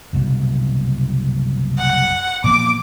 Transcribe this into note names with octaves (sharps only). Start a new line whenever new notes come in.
F#1 C2 B2
F#5
A#2 F3 B3 D6